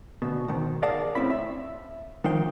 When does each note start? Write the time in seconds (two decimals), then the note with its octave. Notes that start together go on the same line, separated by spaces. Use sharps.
0.22 D2 B2
0.48 G#2 B2 D#3
0.82 G#4 A#4 D5 F5 F#5 A5
1.15 A2 C4 C#4 E4 B5
1.30 E5
2.24 D#3 F3 D#4 F5 G5